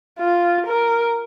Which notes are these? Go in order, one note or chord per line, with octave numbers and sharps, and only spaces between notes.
F4
A#4